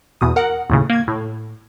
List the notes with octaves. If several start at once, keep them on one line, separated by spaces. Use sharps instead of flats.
E2 B2 D#6
A#4 F#5
D#2 A2 C#3
A#3 G#6
A2